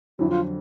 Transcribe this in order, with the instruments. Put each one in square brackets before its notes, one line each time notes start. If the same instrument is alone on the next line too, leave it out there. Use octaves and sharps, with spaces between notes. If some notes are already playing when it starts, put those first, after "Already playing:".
[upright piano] F2 D3 F#3 [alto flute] E4
[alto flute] F4